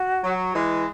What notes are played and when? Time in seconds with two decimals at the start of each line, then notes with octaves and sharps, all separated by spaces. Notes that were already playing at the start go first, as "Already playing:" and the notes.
Already playing: F#4
0.24 F#3
0.54 E3 G#3